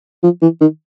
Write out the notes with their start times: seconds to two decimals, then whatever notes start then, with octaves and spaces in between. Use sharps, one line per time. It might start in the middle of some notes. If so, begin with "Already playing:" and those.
0.23 F3
0.42 E3
0.61 D#3